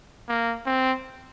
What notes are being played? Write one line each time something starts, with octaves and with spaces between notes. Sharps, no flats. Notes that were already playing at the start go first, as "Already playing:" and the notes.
A#3
C4